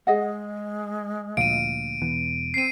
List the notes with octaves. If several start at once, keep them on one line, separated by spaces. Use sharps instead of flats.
G#3 G#4 D#5 F#5
D2 A#2 F3 F5 D7 D#7
E1 E3 B3
C4 C7 D#7